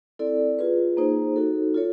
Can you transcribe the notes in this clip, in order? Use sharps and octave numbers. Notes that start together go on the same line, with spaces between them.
C4 E4 A4 D5
F4 G#4 B4
A#3 D#4 G#4 C5
D#4 F#4 A4
F4 A4 C#5